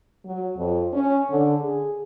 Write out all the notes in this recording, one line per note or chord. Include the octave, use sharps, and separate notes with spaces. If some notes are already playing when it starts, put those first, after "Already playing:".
F#3
F2
C#4
D3
G#4